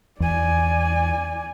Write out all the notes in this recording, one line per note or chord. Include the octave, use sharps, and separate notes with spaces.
E2 D5 G#5